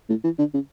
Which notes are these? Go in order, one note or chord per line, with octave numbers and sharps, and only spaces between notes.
A2
E3
D3
C#3